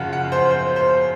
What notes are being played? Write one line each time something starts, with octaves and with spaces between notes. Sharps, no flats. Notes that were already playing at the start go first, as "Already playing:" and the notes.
Already playing: F#2 C#3 F3 F5 F#5
F#5
C5
C5
C5